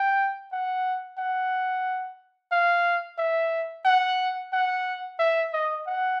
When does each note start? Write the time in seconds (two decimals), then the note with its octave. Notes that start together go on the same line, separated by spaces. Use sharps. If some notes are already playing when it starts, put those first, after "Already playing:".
Already playing: G5
0.52 F#5
1.18 F#5
2.52 F5
3.18 E5
3.85 F#5
4.53 F#5
5.19 E5
5.53 D#5
5.86 F#5